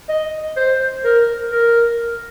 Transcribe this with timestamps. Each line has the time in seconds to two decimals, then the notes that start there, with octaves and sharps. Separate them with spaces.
0.09 D#5
0.57 C5
1.04 A#4
1.51 A#4